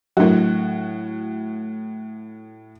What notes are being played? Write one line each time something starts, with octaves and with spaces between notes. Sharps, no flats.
A2 F#3 D4 F#4 A#4